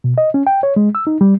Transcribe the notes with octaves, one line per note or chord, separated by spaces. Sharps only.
B2
D#5
C#4
G5
C#5
G#3
E6
D#4
G3